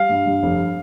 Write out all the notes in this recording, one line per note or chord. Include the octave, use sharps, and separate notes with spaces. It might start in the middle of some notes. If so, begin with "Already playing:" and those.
Already playing: G3 F5
G2
G2
F1